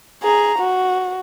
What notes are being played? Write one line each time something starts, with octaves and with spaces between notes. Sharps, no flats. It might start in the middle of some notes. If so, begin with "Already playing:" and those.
G#4 A#5
F#4